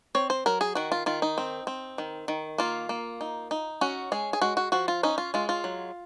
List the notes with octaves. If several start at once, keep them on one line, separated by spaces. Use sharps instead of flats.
C4 C#5
C5
F#3 A#4
G#4
D#3 F#4
F4
D#3 F4
D#4
C4
C4
D#3
D#3
A#3 F4
A#3
D#4
D#4
C#4 F#4
G#3 G#4
G#4
G#3 F#4
F#4
F3 F#4
F4
C#4 D#4
F4
G#3 F4
F4
F#3